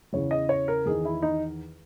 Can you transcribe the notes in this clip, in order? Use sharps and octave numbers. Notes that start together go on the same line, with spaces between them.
E2 C#3 E3 C#5
D#5
C#5
A#4
E2 D#3 G#4
E4
D#4